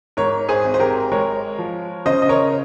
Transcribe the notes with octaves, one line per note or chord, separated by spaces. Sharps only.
G#2 A#4 C#5
G#4 C5
G#1
C5
G4 A#4
G#3 A#4 C#5
F3
C#3 C5 D#5
D#5
A#4 C#5